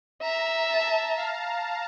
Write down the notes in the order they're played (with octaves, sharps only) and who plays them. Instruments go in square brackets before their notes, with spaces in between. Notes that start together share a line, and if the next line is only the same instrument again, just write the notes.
[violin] E5 [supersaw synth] A#5
[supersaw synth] A5
F5